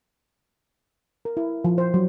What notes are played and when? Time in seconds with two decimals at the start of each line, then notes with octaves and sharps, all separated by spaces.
1.25 A#4
1.37 E4
1.64 F3
1.78 C5
1.94 F#3